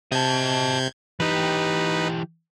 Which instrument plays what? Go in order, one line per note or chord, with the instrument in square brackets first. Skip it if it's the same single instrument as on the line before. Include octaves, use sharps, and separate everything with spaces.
[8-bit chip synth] C3 G6 G#6 [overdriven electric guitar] D#5 A5
[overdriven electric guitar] E3 G4 [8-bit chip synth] D#4 B4